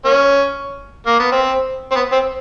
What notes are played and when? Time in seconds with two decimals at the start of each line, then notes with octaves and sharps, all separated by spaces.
0.05 A#3 C#4
1.06 A#3
1.19 B3
1.32 C4
1.92 C4
1.96 B3
2.12 C4